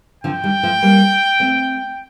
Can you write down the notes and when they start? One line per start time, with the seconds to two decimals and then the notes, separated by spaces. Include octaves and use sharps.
0.24 D3 F3 G5
0.44 D#3 G3
0.63 F3 A3
0.82 G3 A#3
1.40 A3 C4